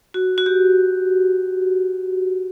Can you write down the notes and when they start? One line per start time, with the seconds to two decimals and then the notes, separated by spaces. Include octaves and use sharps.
0.14 F#4
0.38 F#4
0.46 G4